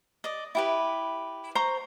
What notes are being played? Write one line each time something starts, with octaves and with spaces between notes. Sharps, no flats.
D5 D#5
E4 G4 B4
C5 A#5 C6 C#6